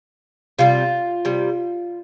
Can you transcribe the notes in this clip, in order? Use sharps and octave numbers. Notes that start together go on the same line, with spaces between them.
C3 G3 F4
C3 G3